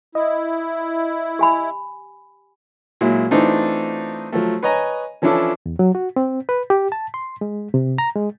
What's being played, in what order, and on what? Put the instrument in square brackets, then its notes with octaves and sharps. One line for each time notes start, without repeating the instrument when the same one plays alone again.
[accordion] E4 [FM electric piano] D#5
[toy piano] G4 G#5 B5
[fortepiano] A#2 F#3 G#3 E4
E3 A3 C4 D4 D#4 F4
F3 F#3 A3
B4 C#5 D#5 G#5 A#5
E3 F3 C#4 D4 E4 A4
[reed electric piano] E2
F#3
F#4
C4
B4
G4
A5
C6
G#3
C3
A#5
G#3